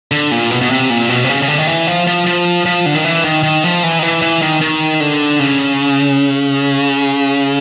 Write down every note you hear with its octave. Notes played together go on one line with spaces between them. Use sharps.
D3
A#2
B2
B2
C3
A#2
B2
C3
C#3
C#3
D3
D#3
E3
F3
F3
F3
F3
D3
D#3
E3
D#3
D#3
F3
E3
D#3
E3
E3
D#3
D#3
D3
C#3